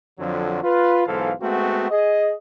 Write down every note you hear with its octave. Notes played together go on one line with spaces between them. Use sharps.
F2 D3 F3 F#3
F4 B4
B1 G#2 E3 A4 C5 F5
G#3 A3 B3 C4 F#4
G#4 D#5